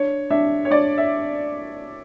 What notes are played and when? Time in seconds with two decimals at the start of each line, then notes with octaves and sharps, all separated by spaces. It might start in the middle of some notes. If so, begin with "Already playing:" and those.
Already playing: D4 C#5
0.30 D4 E5
0.65 C#5
0.70 D4 D5
0.98 E5